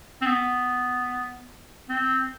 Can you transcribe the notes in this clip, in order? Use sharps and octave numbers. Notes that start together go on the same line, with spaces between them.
C4
B3
C4